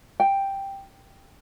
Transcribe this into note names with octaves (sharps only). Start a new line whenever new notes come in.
G5